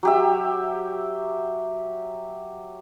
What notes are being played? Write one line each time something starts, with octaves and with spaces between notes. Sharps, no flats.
F#3 G4 E5